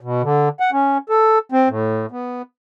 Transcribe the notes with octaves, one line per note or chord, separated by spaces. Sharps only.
B2
D3
F#5
C#4
A4
C4
A2
B3